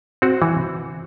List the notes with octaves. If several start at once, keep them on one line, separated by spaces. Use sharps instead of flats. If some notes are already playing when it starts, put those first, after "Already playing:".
C4 F#4
E3